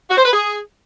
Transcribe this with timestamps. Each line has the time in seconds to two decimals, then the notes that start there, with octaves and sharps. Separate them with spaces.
0.09 F#4
0.17 C5
0.25 B4
0.33 G#4